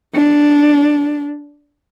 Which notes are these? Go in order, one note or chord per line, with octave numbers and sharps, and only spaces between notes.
D4